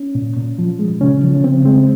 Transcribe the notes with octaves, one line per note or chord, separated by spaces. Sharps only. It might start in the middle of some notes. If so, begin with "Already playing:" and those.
Already playing: C#4
A#2
A#2
F3
G#3
C#3 C#4
F3
C#4
C#3 C4
G#3 C4